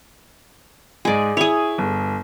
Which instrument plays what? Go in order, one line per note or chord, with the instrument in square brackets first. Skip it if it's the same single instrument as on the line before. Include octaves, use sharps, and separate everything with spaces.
[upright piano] G#2 G#3 [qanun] G#4 D5
[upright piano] E4 [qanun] G#4 C#5
[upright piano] G1